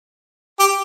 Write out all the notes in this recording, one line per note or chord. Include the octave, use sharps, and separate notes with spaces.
G4